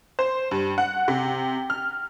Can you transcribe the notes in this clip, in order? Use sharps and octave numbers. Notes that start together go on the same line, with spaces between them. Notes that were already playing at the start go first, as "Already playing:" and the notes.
C5
G2
F#5
C3
F6